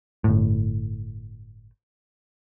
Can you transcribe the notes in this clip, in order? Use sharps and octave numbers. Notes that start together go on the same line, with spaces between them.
G1 A2